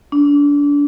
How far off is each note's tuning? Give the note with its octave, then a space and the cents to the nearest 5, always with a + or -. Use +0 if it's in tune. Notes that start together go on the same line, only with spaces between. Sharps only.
D4 -30